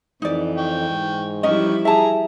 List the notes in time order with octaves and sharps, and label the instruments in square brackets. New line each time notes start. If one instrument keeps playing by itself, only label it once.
[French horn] F2 [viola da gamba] E3 [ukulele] D#4 D5
[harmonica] G5 C#6
[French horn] G#2
[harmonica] D#3 C#6 [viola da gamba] F3 G3 E4 [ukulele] C#4 D#5
[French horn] G#4 [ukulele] E5 A5 [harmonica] A#5